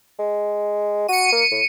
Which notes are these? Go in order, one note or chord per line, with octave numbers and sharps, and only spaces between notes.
G#3
F#4 C#7 D#7
A#3
A2